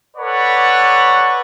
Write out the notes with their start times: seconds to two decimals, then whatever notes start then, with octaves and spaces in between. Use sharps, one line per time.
0.17 A4 B4 C#5 D5 F#5